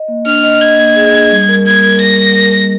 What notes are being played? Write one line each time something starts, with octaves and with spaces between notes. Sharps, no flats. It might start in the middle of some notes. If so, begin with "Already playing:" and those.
Already playing: D#5
A#3
D4 F6
D#5
D#5 G#6
A#3
G#4
D4
G3
A#4
A#3 G#6
A#4
G3 A#6
G3
A#4
A#4